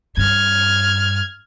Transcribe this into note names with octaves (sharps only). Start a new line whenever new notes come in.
G2 F6 G#6